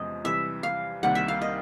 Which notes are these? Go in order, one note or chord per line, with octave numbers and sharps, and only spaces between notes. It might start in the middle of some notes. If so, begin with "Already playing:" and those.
Already playing: E2 C3 F3 G#3 C#4 D#5
C3 E3 G3 E5
F5
C2 C3 D#3 G3 A#3 F#5
E5
F5
D#5